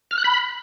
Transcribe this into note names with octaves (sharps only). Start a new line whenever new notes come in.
F6
F#6
B5